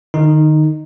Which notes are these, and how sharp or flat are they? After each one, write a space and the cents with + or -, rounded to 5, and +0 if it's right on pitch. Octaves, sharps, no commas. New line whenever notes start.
D#3 -40 D#4 +0